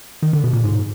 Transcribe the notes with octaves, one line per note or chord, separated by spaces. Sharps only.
D#3
D3
B2
A#2
G#2